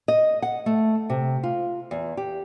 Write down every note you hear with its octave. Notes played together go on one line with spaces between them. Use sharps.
D#5
F#5
A3
C3
F4
E2
G4